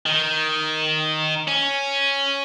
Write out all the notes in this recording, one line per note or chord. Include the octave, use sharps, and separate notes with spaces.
D#3
C#4